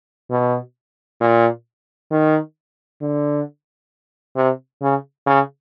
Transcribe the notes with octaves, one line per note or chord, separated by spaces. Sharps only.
B2
A#2
D#3
D3
C3
C#3
C#3